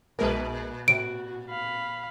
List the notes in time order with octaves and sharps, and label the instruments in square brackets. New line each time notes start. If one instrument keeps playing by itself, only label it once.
[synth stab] B1 G#3 A#4 [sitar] A#2 B4
[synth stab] A2 C3 [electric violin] F#4 [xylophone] D7
[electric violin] F5 B5